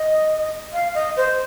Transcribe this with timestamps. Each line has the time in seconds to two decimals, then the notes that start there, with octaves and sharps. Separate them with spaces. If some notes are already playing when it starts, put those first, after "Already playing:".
Already playing: D#5
0.73 F5
0.95 D#5
1.17 C5